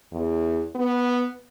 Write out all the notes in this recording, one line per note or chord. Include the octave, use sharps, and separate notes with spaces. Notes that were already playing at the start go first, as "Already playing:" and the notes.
E2
B3